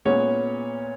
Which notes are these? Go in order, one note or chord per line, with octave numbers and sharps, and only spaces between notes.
A#2 G#3 B3 C#4 C#5